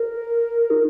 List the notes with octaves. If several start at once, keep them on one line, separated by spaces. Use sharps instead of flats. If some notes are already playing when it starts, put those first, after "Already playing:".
Already playing: A#4
D#4